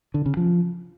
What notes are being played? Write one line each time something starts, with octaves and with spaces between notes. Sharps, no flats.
D3
C#3
F3